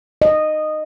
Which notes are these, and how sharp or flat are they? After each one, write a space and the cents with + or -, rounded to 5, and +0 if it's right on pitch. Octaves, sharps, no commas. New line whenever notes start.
D#5 -15